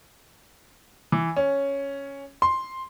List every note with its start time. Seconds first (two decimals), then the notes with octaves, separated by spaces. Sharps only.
1.12 E3
1.36 C#4
2.42 C6